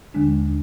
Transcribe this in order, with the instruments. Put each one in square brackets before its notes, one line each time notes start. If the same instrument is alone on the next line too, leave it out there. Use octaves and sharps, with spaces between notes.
[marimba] D#2 D3 G#3 D4